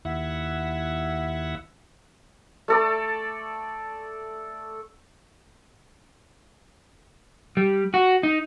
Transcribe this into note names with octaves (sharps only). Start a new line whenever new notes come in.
D#2 E4 E5 F#5
A3 A4 D5
G3
F#4
D#4